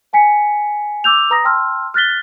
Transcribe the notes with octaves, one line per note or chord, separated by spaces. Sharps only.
G5 G#5 B6 C#7
D6 E6 G6 F7
B4 A#5 D#6 A#6
G5 A5 C6 E6 F6
F6 F#6 A6 B6 G7